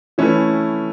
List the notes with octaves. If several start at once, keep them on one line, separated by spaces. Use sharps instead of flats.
E3 A3 C#4 E4 B4